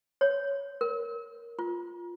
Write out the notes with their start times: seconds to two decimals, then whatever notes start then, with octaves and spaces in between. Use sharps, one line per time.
0.21 C#5
0.81 A#4
1.59 F4